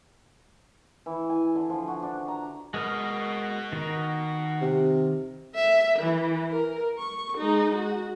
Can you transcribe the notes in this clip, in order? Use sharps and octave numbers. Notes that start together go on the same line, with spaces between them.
E3
G#5
D3
F3
F#4
D4
A#5
G#3 F#4 A#4 D#5 F6
D#3 A#4
C3
E5
E3
A#4
C#6
G#3 D#4
F#4